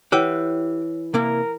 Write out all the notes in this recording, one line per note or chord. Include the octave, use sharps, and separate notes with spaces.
E3 G4 C#5 F#5 G5 E6
C3 A#3 E4 A#4